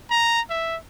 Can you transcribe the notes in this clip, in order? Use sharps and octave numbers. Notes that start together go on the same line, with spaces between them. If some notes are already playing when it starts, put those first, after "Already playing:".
A#5
E5